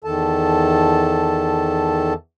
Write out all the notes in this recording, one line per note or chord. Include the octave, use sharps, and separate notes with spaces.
E2 D#3 A4 A5